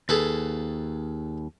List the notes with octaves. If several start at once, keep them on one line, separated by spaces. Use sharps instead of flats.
D#2 G#4 A4 B4